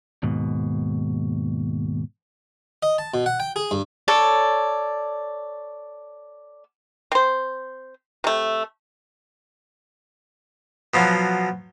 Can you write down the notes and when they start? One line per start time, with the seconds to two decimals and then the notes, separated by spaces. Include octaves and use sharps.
0.23 D#2 G#2 B2
2.83 D#5
2.98 A5
3.14 B2
3.26 F#5
3.40 G5
3.56 G#4
3.71 G2
4.08 A4 C#5 D5
7.12 C4 C5
8.24 C3 A3
10.94 B2 F3 F#3